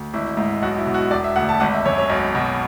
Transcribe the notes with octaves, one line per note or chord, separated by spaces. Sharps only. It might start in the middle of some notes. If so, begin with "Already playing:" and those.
Already playing: D2
G#1 E4
G#2 E4
B1 F#4
E4
B2
F#4
E1 D5
E5
D2 F#5
A5
G#1 F#5
E5
F#2 C#5
C#5
B1
B2